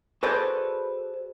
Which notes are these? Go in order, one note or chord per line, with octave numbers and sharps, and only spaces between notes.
F#4 G#4 A4 B4 C5 D5